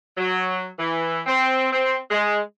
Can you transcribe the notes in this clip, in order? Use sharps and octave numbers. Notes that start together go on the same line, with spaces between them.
F#3
E3
C4
C4
G#3